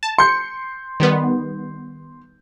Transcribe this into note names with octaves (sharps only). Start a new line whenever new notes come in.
A5
C6 G6 C#7
D#3 G3 B3